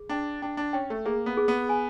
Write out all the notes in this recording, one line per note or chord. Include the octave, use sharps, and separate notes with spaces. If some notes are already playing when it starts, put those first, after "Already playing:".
Already playing: G#4
D4 G5
D4 G5
D4
C#4 G5
A3
A#3 G#4
B3
G#4
B3
G#5